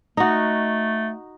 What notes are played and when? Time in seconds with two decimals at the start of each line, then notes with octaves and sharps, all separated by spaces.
0.17 A3 D#4 F#4